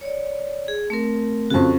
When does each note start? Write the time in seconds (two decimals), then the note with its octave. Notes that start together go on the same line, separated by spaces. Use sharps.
0.01 C#5 D5
0.68 G#4
0.90 A3 C4 A#4
1.50 F2 C#3 F#4 A4 C#6